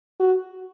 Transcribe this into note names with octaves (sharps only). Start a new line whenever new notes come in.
F#4